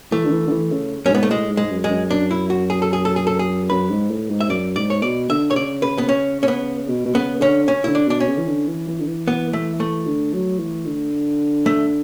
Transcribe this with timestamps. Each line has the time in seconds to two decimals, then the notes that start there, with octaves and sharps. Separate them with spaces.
0.12 E3 A3
0.25 D3
0.31 E3
0.47 D3
0.51 E3
0.72 C#3
1.05 F#2 C#4
1.11 G#2 B3
1.23 A3
1.31 A2 G#3
1.50 G#2
1.57 G#3
1.64 G#2
1.71 F#2
1.84 G#3
1.90 F#2
2.10 F#2 D4
2.31 E4
2.50 F#4
2.70 G#4
2.82 A4
2.93 G#4
3.05 A4
3.16 G#4
3.27 A4
3.39 G#4
3.70 F#2 B4
3.90 G#2
4.10 A2
4.30 G#2
4.41 E5
4.49 F#2 D5
4.76 G#2 D5
4.90 C#5
5.02 B2 D5
5.29 D3 E5
5.50 C#5
5.56 C#3 D5
5.82 C#3 B4
5.98 B3
6.09 C#4
6.43 C#4
6.48 B3
6.88 B2
7.05 B2
7.15 C#3 B3
7.41 D3 C#4
7.68 C#4
7.84 D3 E4
7.95 D4
8.07 B2 D4
8.20 C#4
8.28 C#3
8.38 E3
8.47 D3
8.67 E3
8.88 E3
9.00 D3
9.07 E3
9.28 B3
9.53 A3
9.80 A3
10.06 D3
10.33 F#3
10.59 E3
10.86 D3
11.66 A3